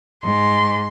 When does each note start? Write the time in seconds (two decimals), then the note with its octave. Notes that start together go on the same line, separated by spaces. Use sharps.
0.24 G#2 C6